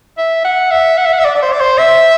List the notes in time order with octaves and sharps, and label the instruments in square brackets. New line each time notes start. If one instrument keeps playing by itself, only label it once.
[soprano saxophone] E5
F#5
E5
F#5
E5
F#5
E5
D5
D5
C5
D5
C5
E5